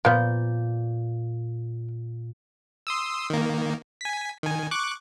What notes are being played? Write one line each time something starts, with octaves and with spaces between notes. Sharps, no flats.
A#2 F3 B3 G6
C6 D#6 E6
D#3 A#3
G#5 B6
D#3 G#5
C#6 D6 F#6